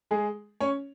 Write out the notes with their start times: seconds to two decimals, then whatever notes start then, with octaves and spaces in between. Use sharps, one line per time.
0.11 G#3 G#4
0.60 C#4 C#5